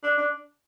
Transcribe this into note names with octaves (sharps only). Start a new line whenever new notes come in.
D4
D4